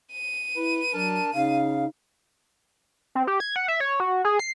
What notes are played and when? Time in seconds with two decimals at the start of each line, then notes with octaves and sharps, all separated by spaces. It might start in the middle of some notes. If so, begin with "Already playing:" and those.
0.13 D#7
0.56 E4 B4
0.94 F#3 D4 A#4 A5
1.34 C#3 D#4 F5
3.15 C4
3.27 G4
3.40 G#6
3.56 F#5
3.68 E5
3.80 C#5
4.00 F#4
4.25 G#4
4.39 C7